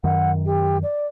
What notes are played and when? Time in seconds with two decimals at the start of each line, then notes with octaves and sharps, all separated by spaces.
0.04 F#2 D#3 F#5
0.46 G4
0.83 D5